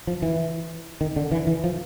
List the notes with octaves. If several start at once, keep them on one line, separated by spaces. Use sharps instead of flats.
F3
E3
D#3
D3
E3
E3
F3